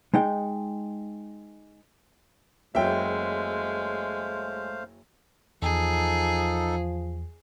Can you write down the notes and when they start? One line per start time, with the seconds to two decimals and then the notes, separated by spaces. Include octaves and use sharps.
0.14 G#3 D#4 G5
2.75 F#1 F#3 G#3 A3 C5 E5 F5 G5
5.62 E2 F3 D#4 G#4 A4